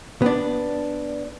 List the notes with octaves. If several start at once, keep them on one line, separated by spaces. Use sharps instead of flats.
B3 D4